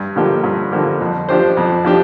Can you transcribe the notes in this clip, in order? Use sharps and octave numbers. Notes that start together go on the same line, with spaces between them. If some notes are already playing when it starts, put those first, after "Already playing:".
Already playing: G2
D3 F3 A#3 G4
G2
D3 F3 A#3 G4
F2
F3 D4 G4 C5
F2
F3 D4 G4